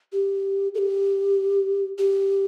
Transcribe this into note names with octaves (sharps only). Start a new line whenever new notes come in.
G4
A4
G4
G4